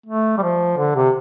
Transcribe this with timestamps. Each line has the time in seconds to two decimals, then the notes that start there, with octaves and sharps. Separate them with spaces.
0.06 A3
0.38 G3
0.42 F3
0.78 D3
0.95 C3